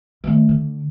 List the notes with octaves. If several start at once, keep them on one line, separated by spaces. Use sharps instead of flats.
D#3 A3
D3